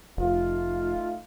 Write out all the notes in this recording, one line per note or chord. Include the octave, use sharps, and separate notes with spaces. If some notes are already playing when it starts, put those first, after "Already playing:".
F1 A3 D#4 F4